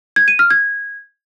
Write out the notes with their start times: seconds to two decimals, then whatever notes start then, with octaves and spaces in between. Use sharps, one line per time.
0.16 G#6
0.28 D#7
0.39 F6
0.51 G#6